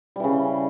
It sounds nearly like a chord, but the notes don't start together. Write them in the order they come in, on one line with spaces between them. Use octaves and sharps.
G3 E3 C#3